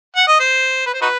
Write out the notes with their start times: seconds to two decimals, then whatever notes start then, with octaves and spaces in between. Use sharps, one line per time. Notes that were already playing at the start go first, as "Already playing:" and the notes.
0.16 F#5
0.28 D#5
0.40 C5
0.86 B4
0.94 C5
1.02 D#4 F#4 B4